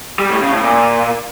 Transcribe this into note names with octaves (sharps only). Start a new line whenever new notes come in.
G3
A2
C#3
A2
A#2